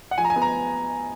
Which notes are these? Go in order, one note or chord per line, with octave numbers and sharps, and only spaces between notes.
F#5
F3 G#5
A#5
G#5
B3
A#5